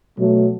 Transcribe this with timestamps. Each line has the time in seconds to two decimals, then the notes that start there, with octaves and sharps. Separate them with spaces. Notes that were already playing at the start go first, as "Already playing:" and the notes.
0.16 B2 F#3 A3